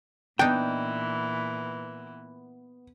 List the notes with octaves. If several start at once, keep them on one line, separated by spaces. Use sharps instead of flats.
A#2 E3 B3 D4 D#4 G5